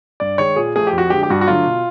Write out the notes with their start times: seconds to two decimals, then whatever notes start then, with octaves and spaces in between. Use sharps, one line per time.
0.20 G2 D5
0.38 D#3 G#3 C#5
0.56 A#2 G#4
0.76 F3 A3 G#4
0.87 G4
0.93 F2
0.98 F#4
1.10 D3 F3 G#3 G4
1.23 G4
1.30 G2 F#4
1.41 F#4
1.48 D3 F#3 A3 F4
1.66 B2